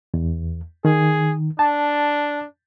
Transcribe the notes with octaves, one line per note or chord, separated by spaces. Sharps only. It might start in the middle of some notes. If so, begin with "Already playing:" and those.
E2
D#3 G#4
D4 A5